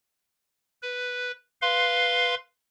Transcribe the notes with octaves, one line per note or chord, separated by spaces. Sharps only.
B4
B4 F5 C6